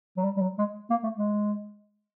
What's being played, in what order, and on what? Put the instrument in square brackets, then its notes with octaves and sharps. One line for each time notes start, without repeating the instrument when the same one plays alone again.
[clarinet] F#3
G3
G3
F#3
G#3
A#3
A3
G#3